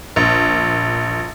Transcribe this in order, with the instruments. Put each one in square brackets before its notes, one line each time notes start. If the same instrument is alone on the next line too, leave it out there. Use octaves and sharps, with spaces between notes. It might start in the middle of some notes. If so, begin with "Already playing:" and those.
[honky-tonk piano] A#1